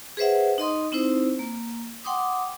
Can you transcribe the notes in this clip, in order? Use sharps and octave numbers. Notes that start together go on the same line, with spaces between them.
G#4 B4 C5 E5 F#5
D#4 D#5 C6 D#6
C4 D#4 E4 C5
A#3
F#5 G5 C6 D6 D#6